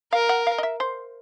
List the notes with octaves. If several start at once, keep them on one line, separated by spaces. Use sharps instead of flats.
A#4 F5
F#5
F5
D#5
E5
C5